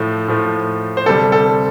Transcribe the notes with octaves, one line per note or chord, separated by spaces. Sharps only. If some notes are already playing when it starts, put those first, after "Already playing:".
Already playing: A2 F3 A3
A2 F3 A3
C5
D2 C3 G3 A4
A4